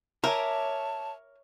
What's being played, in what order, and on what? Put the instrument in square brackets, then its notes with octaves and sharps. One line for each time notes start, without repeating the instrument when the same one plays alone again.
[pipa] A#4 [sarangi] C#5 [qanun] E5 G#5 D6 [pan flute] A5